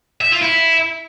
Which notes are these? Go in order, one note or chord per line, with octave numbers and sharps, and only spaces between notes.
E5
F4
E4